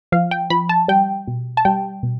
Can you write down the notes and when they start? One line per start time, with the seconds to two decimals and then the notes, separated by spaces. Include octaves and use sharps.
0.12 F3 F5
0.31 G5
0.50 F3 B5
0.69 A5
0.88 G3 G5
1.27 B2
1.57 A5
1.65 G3 G5
2.03 B2